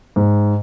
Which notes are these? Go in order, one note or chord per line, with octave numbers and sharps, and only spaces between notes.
G#2